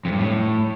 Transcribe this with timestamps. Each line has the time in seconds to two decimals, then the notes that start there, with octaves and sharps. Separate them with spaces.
0.05 F2
0.12 G2
0.19 A2